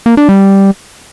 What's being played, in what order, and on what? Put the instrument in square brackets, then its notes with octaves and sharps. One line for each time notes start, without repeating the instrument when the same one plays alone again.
[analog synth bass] A#3
D4
G3